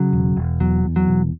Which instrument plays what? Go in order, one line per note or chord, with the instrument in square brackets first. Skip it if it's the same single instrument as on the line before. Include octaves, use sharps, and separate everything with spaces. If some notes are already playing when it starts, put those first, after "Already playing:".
Already playing: [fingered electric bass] C#3 [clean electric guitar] F#3
[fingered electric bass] E1
E1
[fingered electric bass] E2 [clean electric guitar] F#3
[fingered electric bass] E2
[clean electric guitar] F#3
[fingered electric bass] E1